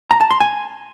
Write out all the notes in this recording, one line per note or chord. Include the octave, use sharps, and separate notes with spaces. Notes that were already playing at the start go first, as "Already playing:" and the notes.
A#5
A5
C6
G#5